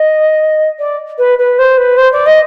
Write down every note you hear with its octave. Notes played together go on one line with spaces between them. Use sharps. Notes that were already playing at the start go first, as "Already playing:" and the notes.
Already playing: D#5
D5
B4
B4
C5
B4
C5
D5
D#5